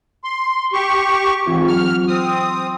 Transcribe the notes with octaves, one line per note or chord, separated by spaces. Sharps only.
C6
G4 C#6
G#2 E3 C4 F4
F#3 F6
C4 D#6